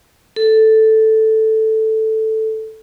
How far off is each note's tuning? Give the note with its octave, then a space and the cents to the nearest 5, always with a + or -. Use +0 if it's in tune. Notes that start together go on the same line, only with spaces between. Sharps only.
A4 +0